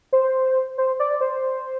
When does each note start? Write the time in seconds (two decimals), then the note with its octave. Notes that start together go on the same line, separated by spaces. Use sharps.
0.13 C5
0.78 C5
1.00 D5
1.21 C5